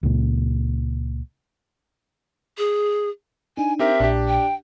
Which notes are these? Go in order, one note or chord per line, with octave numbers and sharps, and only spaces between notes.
C#2 A#2
G#4
D4 D#4 G#5
C4 G4 A#4 E5
A#1 A#2 D4 G4
G5